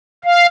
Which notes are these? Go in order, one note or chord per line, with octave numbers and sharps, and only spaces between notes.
F5